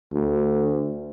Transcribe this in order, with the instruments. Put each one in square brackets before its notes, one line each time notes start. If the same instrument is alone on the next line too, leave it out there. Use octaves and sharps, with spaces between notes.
[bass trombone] D2